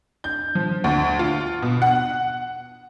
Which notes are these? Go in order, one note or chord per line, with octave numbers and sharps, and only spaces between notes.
G6
F3
D2
F4
B2
F#5